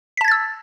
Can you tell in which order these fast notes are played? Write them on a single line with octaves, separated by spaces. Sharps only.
B6 A5 G#6 A6 E6